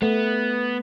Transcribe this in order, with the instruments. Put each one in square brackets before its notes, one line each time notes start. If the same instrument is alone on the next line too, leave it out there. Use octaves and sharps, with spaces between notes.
[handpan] A3 [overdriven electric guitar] B3